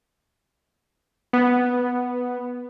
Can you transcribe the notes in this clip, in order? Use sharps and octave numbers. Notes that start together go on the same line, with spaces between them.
B3